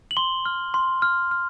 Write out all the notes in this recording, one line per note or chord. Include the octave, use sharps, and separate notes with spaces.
F#7
C6 G7
F6
C6
F6
F6